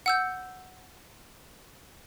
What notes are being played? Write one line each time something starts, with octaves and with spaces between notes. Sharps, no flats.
F#5 E6 G6